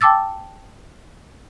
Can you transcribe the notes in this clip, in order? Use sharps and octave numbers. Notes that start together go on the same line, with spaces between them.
G5 A5 D6 E6 A6